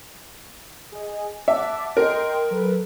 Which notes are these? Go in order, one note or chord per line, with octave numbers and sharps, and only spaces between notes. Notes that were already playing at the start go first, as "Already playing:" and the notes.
G#4 D#5
E5 F#5 A5 D6
A#4 D#5 G5 C6
F#3 A4 B4